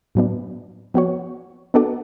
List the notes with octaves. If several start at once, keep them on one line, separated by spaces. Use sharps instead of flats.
A2 F#3 B3 D4
F3 B3 F#4 C#5
B3 D4 F#4 A4 D5